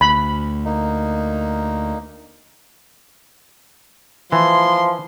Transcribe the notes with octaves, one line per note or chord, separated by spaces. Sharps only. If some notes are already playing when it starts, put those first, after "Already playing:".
D2 B5
A#3 D#4
E3 F3 C6